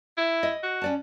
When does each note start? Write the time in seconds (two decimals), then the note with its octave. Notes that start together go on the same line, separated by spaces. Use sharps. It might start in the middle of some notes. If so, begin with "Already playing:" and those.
0.18 E4
0.43 D#5
0.63 F#4
0.82 C#4 D5 A5